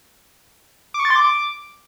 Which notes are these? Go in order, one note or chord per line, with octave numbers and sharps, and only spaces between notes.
D6
C#6
A6
C6
D6